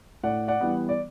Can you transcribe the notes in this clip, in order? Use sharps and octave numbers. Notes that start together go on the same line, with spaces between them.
A2 D5 F#5
D5 F#5
E3 G3 B3
D5